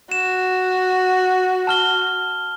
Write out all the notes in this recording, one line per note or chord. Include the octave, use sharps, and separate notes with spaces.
F#4 E7
A5 F6 G7